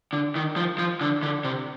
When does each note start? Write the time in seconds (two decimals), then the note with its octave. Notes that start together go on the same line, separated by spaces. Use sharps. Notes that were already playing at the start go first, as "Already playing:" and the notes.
0.13 D3
0.36 D#3
0.56 F3
0.78 F3
1.01 D3
1.23 D3
1.44 C3